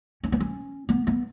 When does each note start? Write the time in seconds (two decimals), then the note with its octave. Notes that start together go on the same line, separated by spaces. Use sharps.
0.24 C#4
0.32 B3
0.40 C#4
0.89 B3
1.07 B3